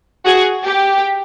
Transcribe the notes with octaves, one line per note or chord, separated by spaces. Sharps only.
F#4 G#4
G4